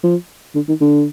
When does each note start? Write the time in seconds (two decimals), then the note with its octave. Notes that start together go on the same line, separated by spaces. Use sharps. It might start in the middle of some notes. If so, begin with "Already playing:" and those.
0.03 F3
0.55 D3
0.68 D#3
0.81 D3